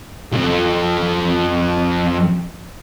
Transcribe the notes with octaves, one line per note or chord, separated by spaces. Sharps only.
B1 F2